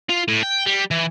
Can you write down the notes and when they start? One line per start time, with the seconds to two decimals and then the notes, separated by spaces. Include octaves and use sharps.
0.10 F4
0.28 A2
0.43 G5
0.66 G3
0.91 E3